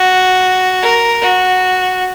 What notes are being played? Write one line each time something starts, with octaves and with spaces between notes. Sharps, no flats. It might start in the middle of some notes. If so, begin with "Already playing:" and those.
Already playing: F#4
A#4
F#4